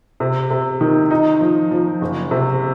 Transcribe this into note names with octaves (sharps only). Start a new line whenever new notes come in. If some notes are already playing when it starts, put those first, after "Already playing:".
C3
C3
D#3
D#4
F3
F3
F#1
C3